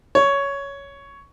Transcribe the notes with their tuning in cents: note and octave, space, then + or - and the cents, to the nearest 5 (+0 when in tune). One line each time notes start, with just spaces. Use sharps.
C#5 +10